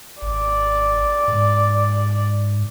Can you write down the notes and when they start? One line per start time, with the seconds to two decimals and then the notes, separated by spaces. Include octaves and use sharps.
0.22 G#1 D5
1.28 G#2